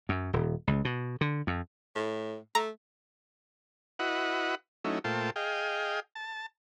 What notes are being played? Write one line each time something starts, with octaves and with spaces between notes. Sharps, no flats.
F#2
D#1
C#2
B2
D3
F2
A2
A3 A#5
E4 F#4 B4 D#5 F#5
F#3 A3 C#4 D#4 E4
A#2 A3 F4 C5 G5 A5
G#4 D#5 F5 G5
A5